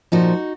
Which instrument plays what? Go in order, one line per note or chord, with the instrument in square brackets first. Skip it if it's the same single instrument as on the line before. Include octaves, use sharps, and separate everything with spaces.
[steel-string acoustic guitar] A#2 F3 D#4 F#4